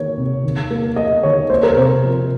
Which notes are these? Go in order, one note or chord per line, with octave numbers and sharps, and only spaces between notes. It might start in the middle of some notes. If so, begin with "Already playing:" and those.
Already playing: D#3 A#3 C#5
C3
D#3
A#3
A#3 D#5
D#3 C#5
A#3 C5
A#4
C3 C5
F3